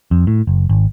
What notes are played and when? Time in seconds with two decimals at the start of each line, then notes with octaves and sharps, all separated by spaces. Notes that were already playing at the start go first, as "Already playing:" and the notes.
0.11 F2
0.27 A2
0.47 F#1
0.69 G#1